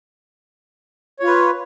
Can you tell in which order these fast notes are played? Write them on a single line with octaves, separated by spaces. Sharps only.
C#5 F4 B4